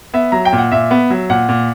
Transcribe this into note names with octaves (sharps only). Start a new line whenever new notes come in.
B3 E5
F#3 A#5
G5
A#2
F#5
A#2 E5
B3
F#3
A#2 F#5
A#2